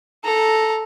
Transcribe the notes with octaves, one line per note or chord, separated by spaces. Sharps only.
A4 A#5